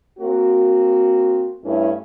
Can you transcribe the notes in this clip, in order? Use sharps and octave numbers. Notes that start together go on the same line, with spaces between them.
A#3 C4 F#4
G2 A3 C#4 E4